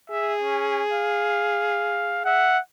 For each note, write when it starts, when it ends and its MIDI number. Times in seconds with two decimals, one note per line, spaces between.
0.10 2.51 68
0.10 0.34 76
0.42 0.82 61
0.93 2.24 77
2.26 2.58 76
2.26 2.60 78